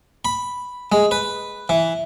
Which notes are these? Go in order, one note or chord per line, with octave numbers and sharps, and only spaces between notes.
B5
G#3
B4
E3